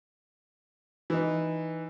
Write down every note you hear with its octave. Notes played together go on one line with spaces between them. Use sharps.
E3 D#4